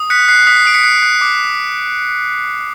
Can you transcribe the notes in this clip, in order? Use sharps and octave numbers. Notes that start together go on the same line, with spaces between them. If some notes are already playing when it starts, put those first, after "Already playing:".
Already playing: D#6
F#6 B6 C#7
F#6 C7
D#6 B6
C7
D#6 D7
B6 C#7
F#6 C7
F#6
D6